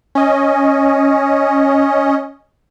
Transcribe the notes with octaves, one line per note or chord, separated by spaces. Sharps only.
C#4 D#5